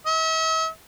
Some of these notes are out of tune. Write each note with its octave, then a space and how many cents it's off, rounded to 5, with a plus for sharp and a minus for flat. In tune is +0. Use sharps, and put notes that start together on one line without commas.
E5 -40